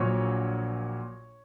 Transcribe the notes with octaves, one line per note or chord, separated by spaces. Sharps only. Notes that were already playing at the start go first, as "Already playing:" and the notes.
Already playing: A#1 A#2 F#3 C#5